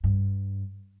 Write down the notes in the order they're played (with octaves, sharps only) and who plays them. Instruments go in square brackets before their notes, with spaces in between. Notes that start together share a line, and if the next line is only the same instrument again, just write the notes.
[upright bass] G2